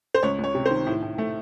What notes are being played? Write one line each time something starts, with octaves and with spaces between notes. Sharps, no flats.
C5
C#2 C#5
C#2
C#5
C3
D#3 C5
A2
A2
A3